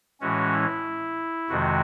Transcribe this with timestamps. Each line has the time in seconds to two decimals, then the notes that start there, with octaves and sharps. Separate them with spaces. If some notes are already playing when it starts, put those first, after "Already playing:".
0.21 A2 E3 G#3 C#4 F#4
0.53 E4
1.49 F2 C3 D#3 G#3 F#4